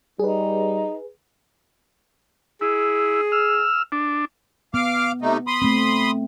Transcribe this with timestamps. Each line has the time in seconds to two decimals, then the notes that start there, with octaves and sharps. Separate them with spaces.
0.19 G3 D#4 G#4 B4
2.61 E4 G#4
3.32 E6 F6
3.92 D4
4.74 B3 F5 D6 F6
5.22 C3 A3 D#4
5.47 B5 C6 D#6
5.62 A3 C4